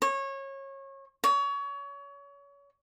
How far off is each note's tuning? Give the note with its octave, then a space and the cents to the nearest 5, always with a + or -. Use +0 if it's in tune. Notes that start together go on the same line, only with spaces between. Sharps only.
C#5 -25
C#5 +30